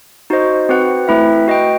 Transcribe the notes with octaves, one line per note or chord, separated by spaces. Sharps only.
D#4 F#4 C5 D#5
C4 F#4 B4 F#5
A3 C4 E4 B4 E5
F#4 B4 D#5 G5